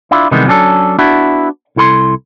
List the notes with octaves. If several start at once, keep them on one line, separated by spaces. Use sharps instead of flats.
D4 E4 F4
C3 D#3 E3 G3 G#3 B3
F#3 C#4 D4 G#4 A4
B3 D4 E4 F#4
C2 E4 A4 B5 C6